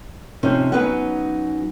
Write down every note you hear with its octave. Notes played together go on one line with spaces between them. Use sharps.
C3 F3 C#4 D#4 C5
F#3 B3 C#4 D#4 F#5